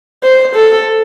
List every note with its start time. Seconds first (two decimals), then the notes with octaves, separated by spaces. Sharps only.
0.24 C5
0.55 A4